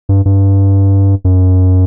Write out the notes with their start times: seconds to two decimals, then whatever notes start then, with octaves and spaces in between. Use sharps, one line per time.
0.09 G2
0.25 G2
1.25 F#2